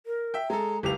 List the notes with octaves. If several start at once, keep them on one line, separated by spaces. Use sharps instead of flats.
A#4
E5 G5
G#3 A4 A#5
F#1 C#2 G4 F7